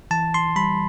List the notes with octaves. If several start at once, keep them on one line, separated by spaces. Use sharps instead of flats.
E3 A5
C6
G3 B5